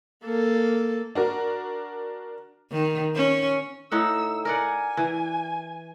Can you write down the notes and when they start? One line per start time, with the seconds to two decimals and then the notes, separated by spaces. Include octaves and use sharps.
0.25 A#3 A4
1.15 D4 F#4 A#4
2.72 D#3
3.15 C#4
3.92 A2 D#4 F#5 E6
4.45 A#4 D5 F#5 G#5
4.97 E3